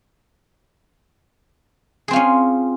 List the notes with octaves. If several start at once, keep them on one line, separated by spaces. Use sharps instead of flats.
C4 C#4 F4 G#4